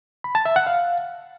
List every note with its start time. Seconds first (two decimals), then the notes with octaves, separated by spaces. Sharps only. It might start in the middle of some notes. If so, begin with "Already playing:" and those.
0.24 B5
0.35 A5
0.45 E5
0.56 F#5
0.67 F5